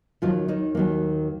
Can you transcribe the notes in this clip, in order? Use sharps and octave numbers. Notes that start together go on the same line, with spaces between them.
D#2 D#3 F3 F#3 A#3 F4
D#3 D#4
D#2 D#3 F#3 A#3